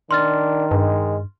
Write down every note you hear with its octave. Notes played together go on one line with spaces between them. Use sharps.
D#3 D4 C6 F6 A6
G2 G#3